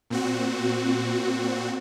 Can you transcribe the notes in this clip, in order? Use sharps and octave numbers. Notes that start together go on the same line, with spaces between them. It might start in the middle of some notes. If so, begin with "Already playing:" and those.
A#2 C4 F#4